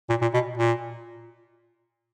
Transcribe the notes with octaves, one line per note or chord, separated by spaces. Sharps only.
A#2
A#2
B2
A#2